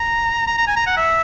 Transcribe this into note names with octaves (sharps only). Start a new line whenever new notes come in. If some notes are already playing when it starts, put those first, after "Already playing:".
Already playing: A#5
A#5
A#5
G#5
A#5
F#5
E5